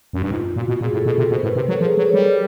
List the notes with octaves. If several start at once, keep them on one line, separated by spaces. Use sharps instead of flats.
F#2
G2
G#2 F4
A#2 F#4
B2
A#2 G#4
A2 A4
B2 A4
C3
B2 C5
A#4
A2 B4
C3 A#4
F#3 A4
F3 G#4
F#3
C#5
G3
D5